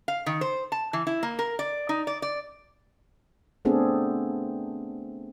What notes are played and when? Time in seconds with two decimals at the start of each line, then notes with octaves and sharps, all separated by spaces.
0.08 F5
0.26 D#3
0.41 C5
0.72 A5
0.93 E3
1.07 E4
1.23 A#3
1.39 A#4
1.59 D5
1.89 D#4
2.07 D5
2.22 D5
3.65 A3 B3 C4 D4 G#4 A4